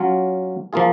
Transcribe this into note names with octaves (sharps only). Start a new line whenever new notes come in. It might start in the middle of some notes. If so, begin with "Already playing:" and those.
Already playing: F#3 C#4 F4
F3 A#3 F4 G#4